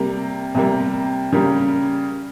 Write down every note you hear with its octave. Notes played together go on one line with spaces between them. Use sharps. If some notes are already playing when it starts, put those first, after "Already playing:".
Already playing: C3 G3 A#3
C3 G3 A#3
C#3 G3 A#3